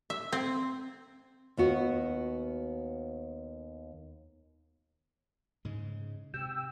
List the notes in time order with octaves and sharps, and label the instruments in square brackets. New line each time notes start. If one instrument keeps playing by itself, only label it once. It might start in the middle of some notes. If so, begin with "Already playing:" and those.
[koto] E5
C4
[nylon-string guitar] D#2 B3 F#4
[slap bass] G#2 C#3 G#3
[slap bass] C3 [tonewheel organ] G5 E6